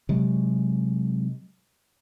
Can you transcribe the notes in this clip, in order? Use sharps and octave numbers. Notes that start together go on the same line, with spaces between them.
C3 F#3 G#3